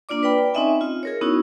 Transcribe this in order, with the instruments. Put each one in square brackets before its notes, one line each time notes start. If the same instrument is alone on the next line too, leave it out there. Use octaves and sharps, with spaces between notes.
[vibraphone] A#3 D4 F4 D5 D6
B4 D5 G5 B5
C4 C#4 D#4 D#5 E5 G#5
F4
G#4 A#4 C#5
B3 C#4 D#4 E4 F#4